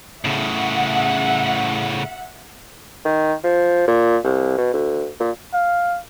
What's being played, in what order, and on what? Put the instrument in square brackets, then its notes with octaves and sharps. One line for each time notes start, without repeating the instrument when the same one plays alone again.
[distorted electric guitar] A2 C#3 [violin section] E5 F#5
[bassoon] D#3
F3
A#2
C2
B2
D2
A#2
[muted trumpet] F5